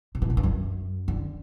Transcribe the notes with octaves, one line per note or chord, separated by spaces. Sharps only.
C3
B2
A2
G2
F#2
D3